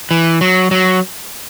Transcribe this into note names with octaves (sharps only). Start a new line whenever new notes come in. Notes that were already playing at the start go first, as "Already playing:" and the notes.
E3
F#3
F#3